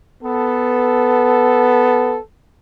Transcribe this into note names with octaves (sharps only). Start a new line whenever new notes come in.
B3 A4